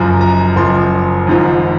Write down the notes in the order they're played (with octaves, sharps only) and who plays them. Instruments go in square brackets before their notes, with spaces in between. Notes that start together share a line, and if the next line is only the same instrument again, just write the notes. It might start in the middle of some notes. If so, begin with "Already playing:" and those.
Already playing: [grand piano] F#1 F#2 F3 A#5
A#5
F#1 F#2 F3 C6
G#1 G#2 F3